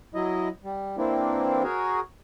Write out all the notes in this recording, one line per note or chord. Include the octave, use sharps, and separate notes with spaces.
F#3 E4 D#5
G3
E3 A#3 C4 D4 E4
F#4 G#4 A#4 C#5